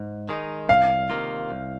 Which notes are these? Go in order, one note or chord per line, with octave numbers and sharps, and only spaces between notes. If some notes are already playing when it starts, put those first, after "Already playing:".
Already playing: G#2
D#3 G#3 D#4
C2 F5
C3 D#3 A#3 F4
C2